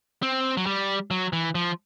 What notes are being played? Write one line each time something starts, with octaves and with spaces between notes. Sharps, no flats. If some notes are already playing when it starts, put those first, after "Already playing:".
C4
F#3
G3
F#3
E3
F3